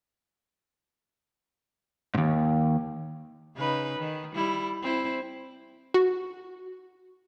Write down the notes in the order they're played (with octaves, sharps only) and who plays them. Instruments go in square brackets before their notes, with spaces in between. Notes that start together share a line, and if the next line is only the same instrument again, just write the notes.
[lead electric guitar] D#2 G#2
[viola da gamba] C#3 D#4 B4
D#3
G3 E4
C4 E4
[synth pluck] F#4